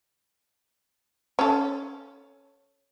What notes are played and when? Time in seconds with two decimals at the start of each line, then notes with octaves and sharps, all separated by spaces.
1.39 C#4 A4